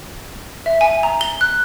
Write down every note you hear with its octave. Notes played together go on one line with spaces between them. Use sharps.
E5
G#5
A#5
G7
F#6